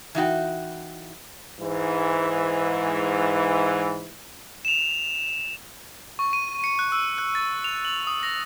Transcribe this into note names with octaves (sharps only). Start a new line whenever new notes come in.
E3 D#4 F#4 G5
G#2 E3
E7 F7
C#6
D#7
C#7
F#6
E6
F#6
A6
F7
F#7
D#6
A#6